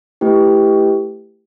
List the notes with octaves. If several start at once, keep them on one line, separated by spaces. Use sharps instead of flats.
A3 E4 G4 B4 G5